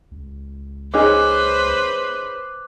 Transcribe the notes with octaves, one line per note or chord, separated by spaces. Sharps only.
C#2
C#4 D#4 G#4 B4 C5 D6 F#6